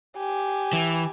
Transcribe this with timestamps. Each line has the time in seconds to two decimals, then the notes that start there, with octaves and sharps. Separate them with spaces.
0.17 G4 G#5
0.73 E3